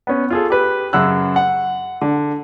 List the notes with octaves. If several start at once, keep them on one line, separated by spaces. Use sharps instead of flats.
B3 C#4
F4 G#4 A4
G4 B4
F#2 C#3 F#5 E6 F#6
F#5
D3